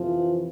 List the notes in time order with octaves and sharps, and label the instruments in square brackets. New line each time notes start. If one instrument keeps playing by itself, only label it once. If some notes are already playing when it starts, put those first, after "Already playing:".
Already playing: [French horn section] F2 C3 E3 F3